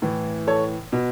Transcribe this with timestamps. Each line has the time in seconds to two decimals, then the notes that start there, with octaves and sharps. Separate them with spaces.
0.02 A2 E3
0.47 A4 C#5
0.92 B2